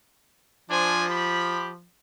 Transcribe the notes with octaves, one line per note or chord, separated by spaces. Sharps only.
F3 D4 C5 G#5
G4 B5